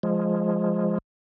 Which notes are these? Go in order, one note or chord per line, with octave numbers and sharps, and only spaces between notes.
F3 G#3